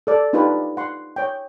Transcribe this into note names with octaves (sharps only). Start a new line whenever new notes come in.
A4 D5
D4 D#4 F4 G4 B4 D5
F#5 C6
C#5 G5